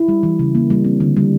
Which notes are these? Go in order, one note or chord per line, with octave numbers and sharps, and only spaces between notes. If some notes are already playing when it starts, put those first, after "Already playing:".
Already playing: E4
G3
E3
C#3
A#3
G3
C4
D3
G3